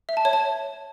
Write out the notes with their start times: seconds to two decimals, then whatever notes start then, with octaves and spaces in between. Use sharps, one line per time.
0.09 E5
0.17 A5
0.25 C#5
0.33 A5